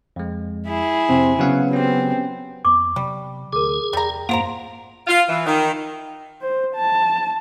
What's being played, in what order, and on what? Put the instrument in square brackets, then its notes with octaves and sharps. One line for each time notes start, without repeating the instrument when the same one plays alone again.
[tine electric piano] F2 G#3
[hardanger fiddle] E4 G#4
[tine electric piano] F2 [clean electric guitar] C3 [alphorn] C4
[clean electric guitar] C#3 F#3 [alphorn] B3 [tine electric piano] F#4 F5 F#5
[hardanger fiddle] C4 [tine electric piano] C#4 G4
[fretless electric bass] F2 B3 [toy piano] C#6 D6
[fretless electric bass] C3 F#3 B3 [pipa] G3
[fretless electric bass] D2 [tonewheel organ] G#4 [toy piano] A#4 D6
[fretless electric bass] E2 [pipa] G3 A#5
[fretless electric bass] F#2 A2 [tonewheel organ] A#3 [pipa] F4 C5 A#5 [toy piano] F#5
[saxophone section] F4
E3
D#3
[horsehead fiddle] C5
A5